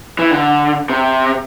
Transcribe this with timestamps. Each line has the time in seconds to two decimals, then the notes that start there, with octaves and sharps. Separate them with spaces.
0.19 E3
0.31 D3
0.90 C3